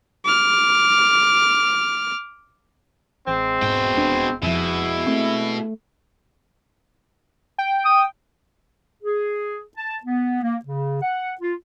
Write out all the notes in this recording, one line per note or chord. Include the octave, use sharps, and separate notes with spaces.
D6 F6
A1 G#3 C4
E1 G#2 B2 G5
D#1 D4
F2 B2 F3 G#3 E4
A3 C4
G5
D#6
G#4
A5
B3
A#3
C#3
F#5
F4